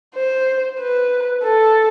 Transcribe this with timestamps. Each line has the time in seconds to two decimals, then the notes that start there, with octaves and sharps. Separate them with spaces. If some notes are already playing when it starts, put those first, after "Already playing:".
0.16 C5
0.80 B4
1.43 A4